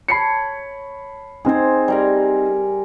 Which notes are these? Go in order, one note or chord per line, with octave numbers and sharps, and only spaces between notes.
C#5 A5 B5 C7 C#7
C4 D#4 G#4 C5
G3 A#4 G#5